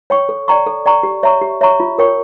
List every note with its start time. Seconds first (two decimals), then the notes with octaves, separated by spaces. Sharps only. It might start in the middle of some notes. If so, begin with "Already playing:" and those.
0.10 C#5 G5 C#6
0.29 A4
0.48 D5 G5 A#5 C#6
0.66 A4
0.86 D5 G5 A#5 C#6
1.03 G4
1.23 C#5 E5 A#5 C#6
1.41 G4
1.61 C#5 E5 A#5 C#6
1.80 F4
1.98 A#4 C#5 G5 C#6